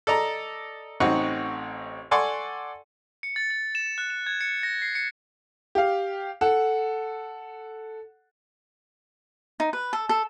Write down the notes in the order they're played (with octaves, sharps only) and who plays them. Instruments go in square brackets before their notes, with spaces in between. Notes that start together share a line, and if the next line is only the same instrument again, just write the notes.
[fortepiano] A4 D5 D#5 A#5
A1 C4 D#4 F#5 C#6
A4 D5 F#5 G#5 C6 C#6
[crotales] C#7
A6
A6
E7
F#6
E7
G#6
C#7
A#6
C7
C#7
[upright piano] G4 F5
A4 F#5
[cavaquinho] D#4
B4
A4
A4